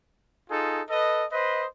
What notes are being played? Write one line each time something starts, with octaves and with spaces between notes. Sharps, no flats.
D#4 F4 G#4 A4
A4 B4 D#5
B4 C5 D#5